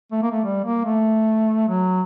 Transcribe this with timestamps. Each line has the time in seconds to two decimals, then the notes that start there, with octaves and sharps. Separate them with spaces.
0.12 A3
0.22 A#3
0.31 A3
0.44 G3
0.64 A#3
0.85 A3
1.68 F#3